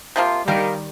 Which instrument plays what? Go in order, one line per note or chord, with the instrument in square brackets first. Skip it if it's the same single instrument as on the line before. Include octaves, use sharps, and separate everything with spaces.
[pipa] C3 F3 A#3 F4
[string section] D#3 G3 [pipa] A#3 G4 A#4